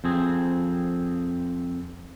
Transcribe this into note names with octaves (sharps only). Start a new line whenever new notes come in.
F2 C4 G#4